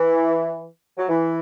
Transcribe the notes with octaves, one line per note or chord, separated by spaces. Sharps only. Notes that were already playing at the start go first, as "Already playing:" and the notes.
Already playing: E3
F#3
E3